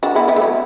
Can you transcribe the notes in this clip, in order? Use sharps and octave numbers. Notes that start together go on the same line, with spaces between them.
D4 F#4
B3 E4
B3 E4
A3
F#3